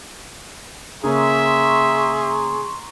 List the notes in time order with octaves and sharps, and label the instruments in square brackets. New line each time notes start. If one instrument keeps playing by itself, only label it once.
[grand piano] C#3 A#3 C#4 [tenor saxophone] G#4 [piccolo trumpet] E5 [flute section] A#5 C6 C#6